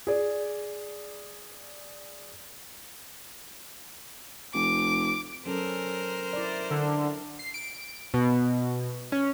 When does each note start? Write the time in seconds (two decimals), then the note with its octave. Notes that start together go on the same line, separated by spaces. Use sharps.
0.07 G#4 D5
4.54 F1 D6
5.46 F#3 C#4 A4 A#4 C5
6.33 E4 D5
6.71 D3
7.39 C7
7.54 D7
8.14 B2
9.12 C#4